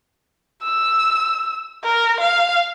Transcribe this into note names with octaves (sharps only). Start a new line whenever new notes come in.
E6
A#4
F5